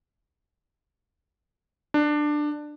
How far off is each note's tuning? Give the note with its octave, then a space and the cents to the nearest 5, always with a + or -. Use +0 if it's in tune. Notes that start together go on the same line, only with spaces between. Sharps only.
D4 +15